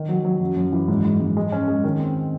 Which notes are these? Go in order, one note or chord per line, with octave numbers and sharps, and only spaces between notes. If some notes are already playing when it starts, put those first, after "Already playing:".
Already playing: D#3
F#3
F#3
F#2
F#2
E3
G#2
G#2
G#2
G#3
C#4
G#3
D#3
C4